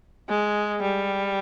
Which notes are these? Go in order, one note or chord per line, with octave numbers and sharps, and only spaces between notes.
G#3
G3